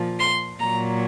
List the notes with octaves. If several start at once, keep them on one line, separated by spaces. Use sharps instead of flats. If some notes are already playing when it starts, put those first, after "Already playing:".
Already playing: A#2 F3
C6
A#2 F#3 A#5